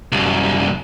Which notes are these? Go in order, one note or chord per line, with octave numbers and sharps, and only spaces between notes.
C2 F#2